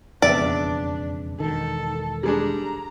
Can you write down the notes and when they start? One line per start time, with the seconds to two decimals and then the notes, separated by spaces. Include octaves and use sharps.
0.22 E1 F2 C#3 B3 D4 D5 E5
1.40 E1 D#3 A4
2.23 G3 G#3 D4 A#5